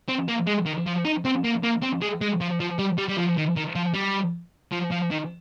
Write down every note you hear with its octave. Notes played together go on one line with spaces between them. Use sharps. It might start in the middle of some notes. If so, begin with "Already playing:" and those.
C4
A#3
G#3
D#3
F3
D#4
C4
A#3
A#3
C4
G#3
G#3
F3
F3
G3
G3
G3
F3
D#3
D#3
F3
G3
F3
F3
D#3